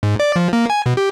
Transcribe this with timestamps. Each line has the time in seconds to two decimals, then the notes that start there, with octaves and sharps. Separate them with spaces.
0.03 G#2
0.20 D5
0.36 F3
0.53 A#3
0.70 G#5
0.86 B2
0.97 G4